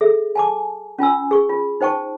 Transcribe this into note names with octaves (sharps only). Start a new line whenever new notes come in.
G#4 A4 E5
G#5 A5 D6
C#4 F4 G#5 E6
G#4 C#6
F4
D#4 C5 G5 A5 C#6